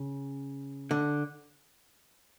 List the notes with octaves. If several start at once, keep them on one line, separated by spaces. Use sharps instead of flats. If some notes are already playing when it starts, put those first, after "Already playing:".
Already playing: C#3
D3